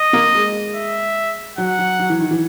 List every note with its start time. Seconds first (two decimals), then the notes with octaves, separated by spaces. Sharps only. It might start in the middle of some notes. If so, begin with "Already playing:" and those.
Already playing: D#5
0.13 A#3
0.35 G#3
0.75 E5
1.58 F#3 F#5
1.79 F#3
1.99 F#3
2.10 E3
2.20 D#3
2.31 E3